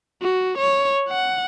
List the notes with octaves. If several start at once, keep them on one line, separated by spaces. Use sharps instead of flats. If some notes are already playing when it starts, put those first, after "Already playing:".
F#4
C#5
F#5